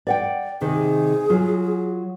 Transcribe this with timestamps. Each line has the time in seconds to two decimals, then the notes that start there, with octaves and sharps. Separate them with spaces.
0.07 D5 F#5 G5
0.61 C3 D#3 G#4
1.30 F#3 F4